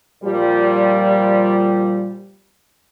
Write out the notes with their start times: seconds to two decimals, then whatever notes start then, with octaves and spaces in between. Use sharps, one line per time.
0.23 A#2 F3 G3